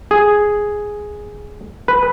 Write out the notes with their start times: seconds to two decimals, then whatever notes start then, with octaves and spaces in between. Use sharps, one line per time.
0.11 G#4
1.88 B4